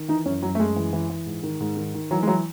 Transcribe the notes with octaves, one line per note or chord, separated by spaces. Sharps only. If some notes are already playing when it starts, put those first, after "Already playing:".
Already playing: D#3
E3 D#4
F#2 C#4
F#2 F#3
A3
F#2 G#3
E3
E3
E3
G#2
D#3
G#2
D#3
D#3
E3 F#3
G#3
E3 F#3